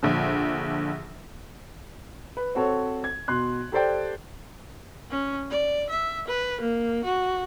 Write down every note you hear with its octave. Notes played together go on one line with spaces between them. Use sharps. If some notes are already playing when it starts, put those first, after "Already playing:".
A#1 D3 F3
B4
C4 F#4 A4 C#5
G#6
B2 C6 F#6
G4 A4 C5 D5 G5
C#4
D5
E5
B4
A#3
F#4